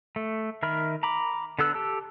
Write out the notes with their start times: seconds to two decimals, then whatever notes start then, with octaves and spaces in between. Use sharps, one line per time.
0.16 A3
0.63 D#3 A#4 E5 B5 F6
1.03 A#5 B5 D6
1.59 D3 B3 A4 E6 F#6
1.74 G4 A4 A5 E6